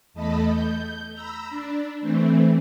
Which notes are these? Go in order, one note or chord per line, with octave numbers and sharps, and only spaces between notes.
E2 A3 A4 D#5 B5
G6
A#5 B5 E6
D4
E3 A3 C4